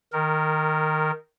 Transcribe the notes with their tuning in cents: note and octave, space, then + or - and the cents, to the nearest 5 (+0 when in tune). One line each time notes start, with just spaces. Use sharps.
D#3 +0 A#4 -20